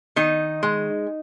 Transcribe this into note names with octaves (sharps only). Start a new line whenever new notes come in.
D#3 D#4
G#3